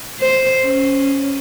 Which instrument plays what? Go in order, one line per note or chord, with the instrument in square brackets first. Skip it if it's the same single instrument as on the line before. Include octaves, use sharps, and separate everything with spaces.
[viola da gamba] C5
C#4